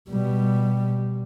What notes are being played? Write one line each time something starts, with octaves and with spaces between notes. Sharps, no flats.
B2 G3